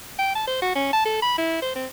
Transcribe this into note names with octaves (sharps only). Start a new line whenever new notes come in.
G5
A5
C5
F#4
C#4
A5
A4
B5
E4
C5
C4